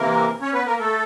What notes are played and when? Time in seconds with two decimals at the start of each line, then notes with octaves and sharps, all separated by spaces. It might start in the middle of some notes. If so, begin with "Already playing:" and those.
Already playing: C3 E3 A#3 A#4
0.41 C#4 C#5
0.54 B3 B4
0.66 A#3 A#4
0.79 A3 A4